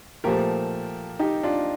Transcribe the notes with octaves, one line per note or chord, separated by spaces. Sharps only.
A#2 F3 A3 G4 A#4
D#4 G4
D4 F4